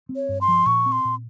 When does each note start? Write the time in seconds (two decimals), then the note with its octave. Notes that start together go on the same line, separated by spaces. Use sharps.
0.09 C4
0.16 C#5
0.29 G2
0.41 C6
0.48 F3
0.66 A#2 C#6
0.86 C4
0.92 C6
1.05 A#2